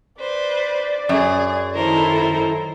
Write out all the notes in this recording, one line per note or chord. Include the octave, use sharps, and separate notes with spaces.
B4 C5 D5
F#2 G#4
D#3 E4 A4 A#4 C5